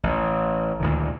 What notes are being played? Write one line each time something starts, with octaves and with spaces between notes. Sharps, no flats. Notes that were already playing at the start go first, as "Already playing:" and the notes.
A1
D2 A#2 D#3